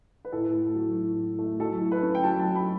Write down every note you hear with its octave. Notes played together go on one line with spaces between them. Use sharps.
B4
A2 A4
A3
F#3
A2
A2
A3
F#3 A4
E4
B4
C#4
G5
F#3 A5
A5
F#3
B5